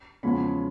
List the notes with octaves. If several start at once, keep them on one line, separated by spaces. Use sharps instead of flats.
E2 C#3 F3 G#3 C#4 B5